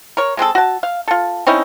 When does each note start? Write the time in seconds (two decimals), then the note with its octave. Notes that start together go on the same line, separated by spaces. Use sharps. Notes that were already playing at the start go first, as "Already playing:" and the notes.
0.17 A#4 C#5
0.37 G#3 C4 G#4 A4
0.55 F#4 A5
0.83 F5
1.08 F4 A4
1.47 C4 C#4 D#4 E4